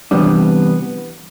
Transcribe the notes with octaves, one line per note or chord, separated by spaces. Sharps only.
C3 E3 G3 B3 D4